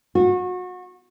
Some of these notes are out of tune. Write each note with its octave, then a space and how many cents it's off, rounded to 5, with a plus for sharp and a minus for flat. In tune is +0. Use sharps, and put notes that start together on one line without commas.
F#4 -30